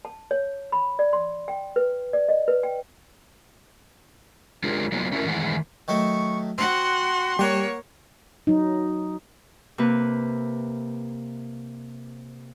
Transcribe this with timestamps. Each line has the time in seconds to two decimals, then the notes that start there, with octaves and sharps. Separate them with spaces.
0.05 A5
0.31 C#5
0.72 B5
0.99 D5
1.13 C6
1.48 G5
1.76 B4
2.13 D5
2.29 D#5
2.48 B4
2.63 G5
4.63 G#3 D4 F4 G4 G#4 A#4
4.92 F#3 A#3 B3 D#4 F4 F#4
5.12 A3 C#4 E4 F#4 A4 A#4
5.26 D#3 E3 G#3 A3 G#4 F#5
5.88 D#3 F#3 A3 C#6
6.58 C4 F#4 F#5 C6 D6
7.39 G3 A#3 G4 C#5 F#5 C#6
8.47 F#3 D#4
9.78 C3 A#3 B4